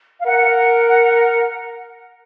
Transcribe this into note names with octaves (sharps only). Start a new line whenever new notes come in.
F5
A#4 F#5